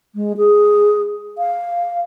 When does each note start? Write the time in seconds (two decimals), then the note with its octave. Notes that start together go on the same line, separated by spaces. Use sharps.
0.15 G#3
0.37 G#4
1.38 F5